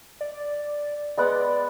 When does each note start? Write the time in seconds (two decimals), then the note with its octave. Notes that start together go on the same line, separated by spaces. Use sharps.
0.21 D5
1.18 G#3 B3 D5 F#5